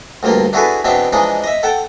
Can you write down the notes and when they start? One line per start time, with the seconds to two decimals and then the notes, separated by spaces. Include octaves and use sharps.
0.23 D2 G2 F3 A#3
0.53 D4 E4 F#4 G#4 A4 B4
0.84 E2 B2 C4 D4 E5
1.13 E3 F3 G#3 D4 D#4
1.44 D#5 E5
1.63 A4 F#5 G5 A5